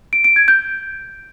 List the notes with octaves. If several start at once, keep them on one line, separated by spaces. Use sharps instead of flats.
D7
D7
G#6
G6